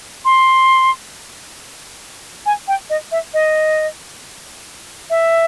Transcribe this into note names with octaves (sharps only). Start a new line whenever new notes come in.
C6
G#5
G5
D#5
E5
D#5
E5